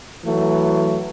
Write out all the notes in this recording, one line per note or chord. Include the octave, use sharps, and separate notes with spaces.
E3 F#3 A3